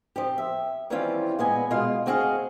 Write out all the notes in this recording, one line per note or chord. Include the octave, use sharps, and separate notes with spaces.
F3 C4 G4
E5
D#3 E3 G3 C4 C#4 F4
A#2 G#3 B3 D#5 G#5
B2 G#3 F4 F5
A3 C4 F#4 G#4 D#5 F5